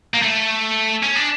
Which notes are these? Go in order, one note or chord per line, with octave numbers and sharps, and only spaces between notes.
A#3
A3
C#4
D4